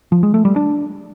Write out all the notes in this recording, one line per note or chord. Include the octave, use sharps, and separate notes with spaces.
F3
G#3
A3
G3
D4